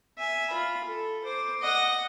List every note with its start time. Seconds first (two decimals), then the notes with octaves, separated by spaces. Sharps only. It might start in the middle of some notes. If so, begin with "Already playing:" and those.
0.18 E5 G#5
0.50 F4 B5
0.84 A4
1.24 C5 D6
1.62 D#5 F#5